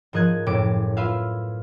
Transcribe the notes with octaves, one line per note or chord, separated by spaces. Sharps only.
G#2 F3 A#4 D#5 F#6 G#6
F#1 A2 D6 D7
F4 B4 E5 F5